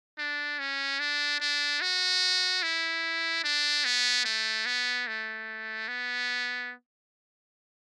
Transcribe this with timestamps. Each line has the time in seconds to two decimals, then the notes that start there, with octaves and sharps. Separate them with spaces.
0.19 D4
0.59 C#4
1.00 D4
1.40 D4
1.81 F#4
2.63 E4
3.44 D4
3.85 B3
4.25 A3
4.66 B3
5.07 A3
5.88 B3